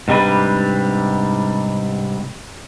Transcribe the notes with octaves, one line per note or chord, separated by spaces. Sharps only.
G#2 C3 G3 D4 B4